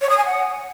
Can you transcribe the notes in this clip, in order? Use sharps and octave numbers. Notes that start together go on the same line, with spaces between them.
C#5
D#6
G#5
F#5